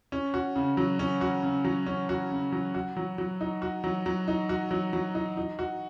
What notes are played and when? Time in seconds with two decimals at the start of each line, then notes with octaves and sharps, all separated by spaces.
0.12 C#4
0.34 F#4
0.56 C#3
0.77 F#3
0.99 C#4
1.21 F#4
1.43 C#3
1.64 F#3
1.86 C#4
2.09 F#4
2.31 C#3
2.52 F#3
2.74 F#4
2.96 F#3
3.18 F#3
3.41 D#4
3.62 F#4
3.84 F#3
4.06 F#3
4.28 D#4
4.49 F#4
4.71 F#3
4.93 F#3
5.15 D#4
5.37 D#4
5.59 F#4